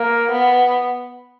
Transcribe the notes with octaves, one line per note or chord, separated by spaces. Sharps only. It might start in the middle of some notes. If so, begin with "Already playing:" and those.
Already playing: A#3
B3